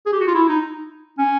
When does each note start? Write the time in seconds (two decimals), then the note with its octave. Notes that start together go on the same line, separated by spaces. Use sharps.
0.06 G#4
0.13 G4
0.20 F#4
0.27 F4
0.35 E4
0.49 D#4
1.19 C#4